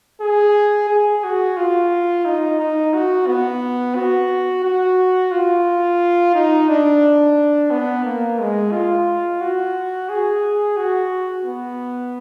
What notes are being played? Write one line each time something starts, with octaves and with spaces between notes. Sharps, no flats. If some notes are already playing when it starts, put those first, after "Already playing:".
G#4
G#4
F#4
F4
D#4
D#4
F#4
B3
F#4
F#4
F4
D#4
D4
B3
A#3
G#3
F4
F#4
G#4
F#4
B3